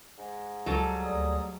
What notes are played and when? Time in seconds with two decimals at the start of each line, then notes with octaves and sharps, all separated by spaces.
0.18 G#2
0.66 C#2 F#3 G3 A4
1.04 D2 D5 D#6